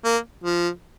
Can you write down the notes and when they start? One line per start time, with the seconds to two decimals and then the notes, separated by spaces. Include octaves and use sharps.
0.05 A#3
0.44 F3